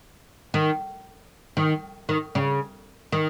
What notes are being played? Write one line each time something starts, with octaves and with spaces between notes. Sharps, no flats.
D#3
D#3
D#3
C#3
D#3